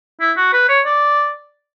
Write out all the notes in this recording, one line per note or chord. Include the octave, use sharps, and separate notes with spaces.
E4
F#4
B4
C#5
D5